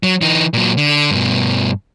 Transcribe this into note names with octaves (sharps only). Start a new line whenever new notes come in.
F#3
E3 D#4
A#2 F#3
D3
G2 B2